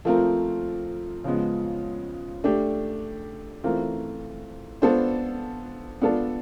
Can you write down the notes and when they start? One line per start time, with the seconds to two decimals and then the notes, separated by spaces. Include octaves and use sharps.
0.05 F3 A3 C4 F4 A#4
1.24 C#3 F3 G#3 B3
2.44 A3 D4 G4
3.64 E3 A3 C4 F4 A#4
4.82 B3 D4 F4 A4 C5
6.02 B3 D4 F4 A4 D5